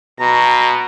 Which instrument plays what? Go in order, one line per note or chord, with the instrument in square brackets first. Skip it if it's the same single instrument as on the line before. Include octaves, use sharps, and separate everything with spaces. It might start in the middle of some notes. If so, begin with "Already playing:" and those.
[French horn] B2 [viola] A#5